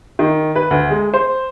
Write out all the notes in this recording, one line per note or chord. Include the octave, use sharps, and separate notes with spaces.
D#3
B4
D2
G#3
C5